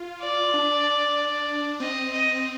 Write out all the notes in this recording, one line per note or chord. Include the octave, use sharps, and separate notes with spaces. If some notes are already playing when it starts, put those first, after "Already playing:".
Already playing: F4
D5
D4
C4 D#5
D#5